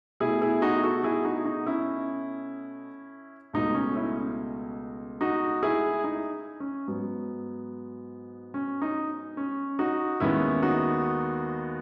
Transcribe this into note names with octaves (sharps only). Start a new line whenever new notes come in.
B2 A3 E4 G#4
E4 G#4
D#4 F#4
F#4 A4
E4 G#4
D#4 F#4
D#4
C#4 E4
C#2 B2 A3 D#4
C#4
C#4 E4
D#4 F#4
E4 G#4
D#4
C#4
G#2 F#3 B3
C#4
D#4
C#4
D#4 F#4
D#2 D#3 G#3 B3 C#4 E4
D#4 F#4